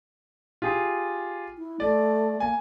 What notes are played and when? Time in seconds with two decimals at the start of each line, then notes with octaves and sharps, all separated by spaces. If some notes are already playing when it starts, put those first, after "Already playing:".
0.62 F4 G4 G#4
1.57 E4
1.80 A3 D5
2.40 A#3 G#5